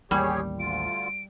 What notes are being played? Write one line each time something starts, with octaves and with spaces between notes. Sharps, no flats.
A1 D#2 G3 A#3 G4 G#4 C#5
D2 D3 F4 D7